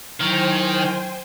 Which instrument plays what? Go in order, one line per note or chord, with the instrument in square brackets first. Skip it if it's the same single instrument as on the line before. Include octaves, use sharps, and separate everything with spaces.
[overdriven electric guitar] D#3 [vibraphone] F#3 E4 C#6 [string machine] C5 G5 G#5